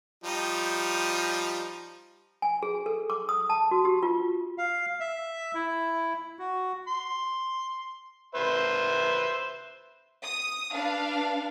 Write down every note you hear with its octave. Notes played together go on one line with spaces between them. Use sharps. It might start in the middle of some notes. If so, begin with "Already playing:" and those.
F3 G3 D#4
G#5
G#4
A4
D6
D#6
A5
F#4
G4
F4
F5
E5
E4
F#4
C6
B4 C5 E5
D#6
D4 B4 F5